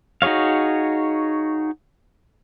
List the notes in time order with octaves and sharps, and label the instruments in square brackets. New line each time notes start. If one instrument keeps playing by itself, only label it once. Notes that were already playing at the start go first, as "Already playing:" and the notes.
[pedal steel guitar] D#4 F#4 G#4 C#5 F5